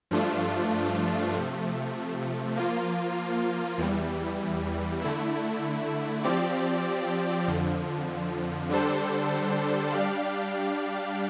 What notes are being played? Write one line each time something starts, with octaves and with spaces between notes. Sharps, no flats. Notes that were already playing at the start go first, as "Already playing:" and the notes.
G2 F3 A3 D4 F4
C3 F3 A3
F3 A#3 F4
E2 E3 G3
D3 A3 E4
F3 C4 G4 D5
F2 D3 F3
D3 G3 D4 A4 C5
G3 D4 G4 D5 F5